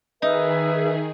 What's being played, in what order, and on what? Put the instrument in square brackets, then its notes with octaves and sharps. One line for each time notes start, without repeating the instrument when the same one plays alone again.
[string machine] D#3 G#4 [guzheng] D#4 [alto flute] B4 [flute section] E5